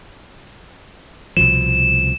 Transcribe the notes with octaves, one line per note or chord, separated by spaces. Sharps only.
C2 B2 F3 E7